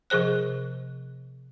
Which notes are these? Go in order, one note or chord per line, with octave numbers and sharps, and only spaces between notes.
C3 F3 G#4 C5 F#6